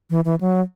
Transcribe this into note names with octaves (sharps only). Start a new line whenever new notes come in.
E3
E3
F#3